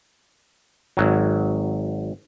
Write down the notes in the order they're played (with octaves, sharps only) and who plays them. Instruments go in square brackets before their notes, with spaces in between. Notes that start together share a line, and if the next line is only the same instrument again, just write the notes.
[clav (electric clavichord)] G#1 F#3